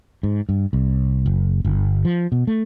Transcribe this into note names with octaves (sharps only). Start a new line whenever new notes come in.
G#2
G2
C2
F#1
G1
F3
B2
A3